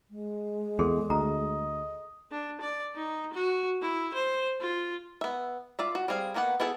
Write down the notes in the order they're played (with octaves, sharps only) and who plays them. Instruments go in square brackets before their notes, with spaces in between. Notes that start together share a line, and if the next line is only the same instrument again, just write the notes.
[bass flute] G#3
[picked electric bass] E2 [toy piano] G#4 A4 C6
[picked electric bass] D2 [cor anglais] D#5 [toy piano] A#5
[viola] D4
D5
D#4
F#4
E4
C5
F4
[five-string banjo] B3 E5
F4 D5 E5
F#4
G3 C4 G#4 F5
D#3 A#3 B3 D4 F#5
B3 E4 G#4 A4